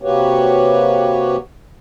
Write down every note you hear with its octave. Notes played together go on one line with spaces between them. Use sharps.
C3 A#3 F#4 G4 B4 C#5